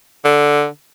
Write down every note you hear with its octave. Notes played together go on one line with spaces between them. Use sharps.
D3